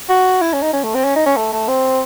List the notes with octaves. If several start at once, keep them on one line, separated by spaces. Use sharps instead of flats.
F#4
E4
C#4
D#4
C#4
A3
C4
C#4
D#4
C#4
A3
A3
C4